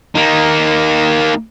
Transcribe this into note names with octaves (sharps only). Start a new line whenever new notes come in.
A#3 D#4